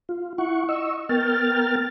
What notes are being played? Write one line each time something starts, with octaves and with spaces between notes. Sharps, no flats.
F4
E4 F#5 C#6
D#5 C#6 E6
B3 A#4 G5 F6 A6